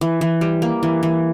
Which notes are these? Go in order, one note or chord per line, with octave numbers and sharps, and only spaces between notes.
E3
E3
G3
A#3
E3
E3